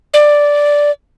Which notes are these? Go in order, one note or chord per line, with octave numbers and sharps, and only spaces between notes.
D5